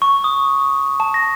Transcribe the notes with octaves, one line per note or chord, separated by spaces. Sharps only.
C#6
D#6
A5
A#6